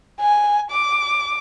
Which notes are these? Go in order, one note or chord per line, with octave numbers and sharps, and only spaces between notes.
G#5
D6